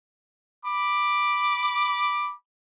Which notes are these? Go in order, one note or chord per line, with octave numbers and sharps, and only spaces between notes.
B5 D6